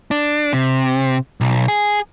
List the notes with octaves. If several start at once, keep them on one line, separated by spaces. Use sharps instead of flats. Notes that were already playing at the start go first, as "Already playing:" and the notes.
D4
C3
B1
G#4